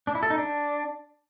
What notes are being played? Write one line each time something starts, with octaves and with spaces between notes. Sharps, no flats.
D4
E4
A4
D#4
D4